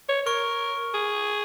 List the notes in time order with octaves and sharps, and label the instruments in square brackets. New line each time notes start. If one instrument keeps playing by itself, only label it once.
[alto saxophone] C#5
[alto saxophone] A#4 [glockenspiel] C#6
[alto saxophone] G#4